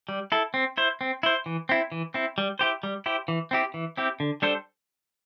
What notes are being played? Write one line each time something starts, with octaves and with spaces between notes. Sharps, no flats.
G3
E4 A4
C4
E4 C5
C4
E4 C5
E3
C4 E4
E3
C4 E4
G3
E4 G4 C5
G3
E4 G4 C5
E3
C4 E4 G4
E3
C4 E4 G4
D3
G3 D4 A4 C5